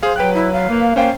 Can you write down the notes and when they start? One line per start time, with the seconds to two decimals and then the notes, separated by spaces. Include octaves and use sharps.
0.03 G#4 C5 F5
0.16 F#3 B4 G5 F#6
0.34 E4
0.52 F5
0.69 A#3
0.96 A#3 C#4 C5 F5 G5